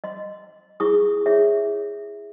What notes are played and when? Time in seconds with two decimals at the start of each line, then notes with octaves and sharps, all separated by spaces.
0.04 D#5 C6
0.80 E4 G#4 C#6 D#6
1.26 E4 G#4 C#5 E5